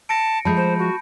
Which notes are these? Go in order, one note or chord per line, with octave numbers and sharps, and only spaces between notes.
A5 A#6 C#7 D7
F3 G#3 A3 A5 B5 G6
C5
F#4